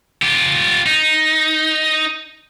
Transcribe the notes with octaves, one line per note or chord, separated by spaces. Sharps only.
F4 G4
D#4